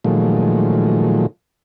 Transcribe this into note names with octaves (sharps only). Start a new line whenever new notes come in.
A#2 D#3 F3 F#3 G#3 A3